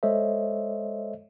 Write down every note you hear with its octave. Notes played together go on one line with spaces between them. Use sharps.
G#3 A4 C5 C#5 D#5 E5